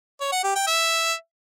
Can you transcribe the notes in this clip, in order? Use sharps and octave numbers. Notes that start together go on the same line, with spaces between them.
C#5
F#5
G4
G5
E5